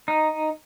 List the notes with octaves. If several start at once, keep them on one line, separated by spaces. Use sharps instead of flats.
D#4